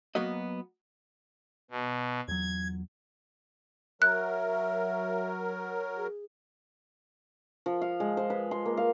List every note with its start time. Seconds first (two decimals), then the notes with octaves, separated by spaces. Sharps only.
0.15 F#3 A#3 B3 F#4 D#5
1.71 B2
2.28 E2 F#3 G#6
4.02 F#3 A#4 E5 F#6
5.97 G#4
7.66 F3
7.82 F5
8.00 G#3
8.17 C5
8.30 B4
8.51 C6
8.66 A#3
8.77 F5